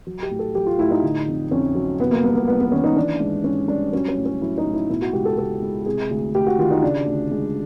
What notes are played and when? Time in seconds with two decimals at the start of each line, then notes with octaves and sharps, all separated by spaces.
0.07 F#3
0.23 G4
0.31 A2
0.39 A4
0.55 F#3 G4
0.67 F4
0.78 A2 E4
0.91 D#4
1.03 D3
1.28 F2
1.51 F2 C#4
1.75 F#3
1.99 C3 B3
2.11 A#3
2.24 C2 B3
2.36 B3
2.48 C2 B3
2.61 B3
2.72 D#3 C#4
2.84 D#4
2.96 E3 D4
3.20 G#2
3.44 G#2 C#4
3.68 G3 D4
3.92 F#3 C#4
4.08 C#4
4.17 A2
4.26 C#4
4.41 F#3 E4
4.58 D#4
4.66 A2
4.74 E4
4.89 B2 E4
5.02 F#4
5.13 C#2 G4
5.25 A4
5.38 C#2 A4
5.62 G#3
5.86 C3 G#4
6.10 D2
6.35 D2 G4
6.47 F#4
6.59 D#3 F4
6.71 D#4
6.83 C#3 D4
7.06 D2
7.31 G#3